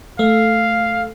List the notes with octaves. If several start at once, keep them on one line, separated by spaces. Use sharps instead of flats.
A3 F5